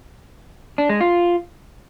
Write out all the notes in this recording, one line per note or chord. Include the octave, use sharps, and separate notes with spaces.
D4
G#3
F4